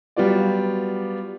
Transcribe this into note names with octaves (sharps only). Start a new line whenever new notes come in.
F#3 G3 B3 F4 D5